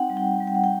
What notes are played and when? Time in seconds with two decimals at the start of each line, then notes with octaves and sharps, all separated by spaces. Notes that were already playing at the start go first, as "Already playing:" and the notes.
Already playing: C4 D#4 F#5 G5
0.10 G3
0.17 G5
0.40 G3
0.47 G5
0.55 F#5
0.64 G5